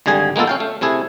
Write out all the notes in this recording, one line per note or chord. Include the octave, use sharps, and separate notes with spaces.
G#1 D3 G3 G#4 G#5
G#3 A#3 B3 F4 A4
C#4 F5 G5
A3
C3 A3 E4 G#4